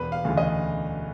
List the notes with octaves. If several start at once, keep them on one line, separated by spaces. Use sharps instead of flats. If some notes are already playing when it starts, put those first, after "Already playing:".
Already playing: E1 B4
F5
D2 C#3 E3
D#5